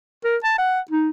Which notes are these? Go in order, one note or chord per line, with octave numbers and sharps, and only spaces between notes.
A#4
A5
F#5
D#4